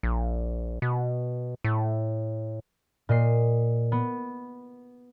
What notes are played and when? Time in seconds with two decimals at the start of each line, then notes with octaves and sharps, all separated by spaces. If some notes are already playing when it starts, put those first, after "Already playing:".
0.03 A#1
0.82 B2
1.64 A2
3.09 A#2 D#5 C7
3.92 B3